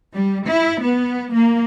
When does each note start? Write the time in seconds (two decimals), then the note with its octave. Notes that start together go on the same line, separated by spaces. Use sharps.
0.14 G3
0.47 E4
0.83 B3
1.33 A#3